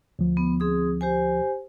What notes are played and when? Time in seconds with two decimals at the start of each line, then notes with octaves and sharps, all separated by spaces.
0.19 D2 F3
0.37 B3
0.60 C4 G#4 D#6
1.01 G4 C5 G#5